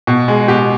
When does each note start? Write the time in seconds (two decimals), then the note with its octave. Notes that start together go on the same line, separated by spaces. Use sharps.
0.07 B2
0.28 G#3
0.48 B2 G4